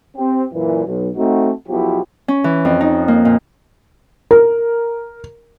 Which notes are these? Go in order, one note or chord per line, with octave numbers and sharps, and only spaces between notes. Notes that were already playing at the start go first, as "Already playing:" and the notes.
C4 G4
F#2 A#2 E3
B1
A3 C4 D#4 F#4
B1 B2 F3 E4 F#4 G4
C#4
E3
F2
D#4
A#3
A#2
A#4